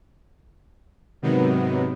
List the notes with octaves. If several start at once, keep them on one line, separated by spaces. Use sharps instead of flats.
G#2 C3 D#3 F#3 B3